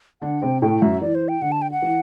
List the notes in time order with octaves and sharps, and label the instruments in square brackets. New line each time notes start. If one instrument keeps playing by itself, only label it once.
[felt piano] D3 D4 [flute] F#5
[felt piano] C3 C4 [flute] G5
[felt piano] A2 A3 [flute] G5
[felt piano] F#2 F#3 [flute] E5
[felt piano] E3 [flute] D5
[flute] C5
G5
[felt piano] D3 [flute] F#5
[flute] A5
G5
F#5
[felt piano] E3